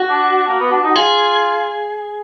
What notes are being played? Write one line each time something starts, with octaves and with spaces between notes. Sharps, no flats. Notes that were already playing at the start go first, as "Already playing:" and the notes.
Already playing: F#4
D4
A#3
B3
D4
D#4
F4 G#4